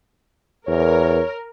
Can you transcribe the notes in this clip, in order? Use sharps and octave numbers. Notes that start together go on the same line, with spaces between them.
E2 A#4 C#5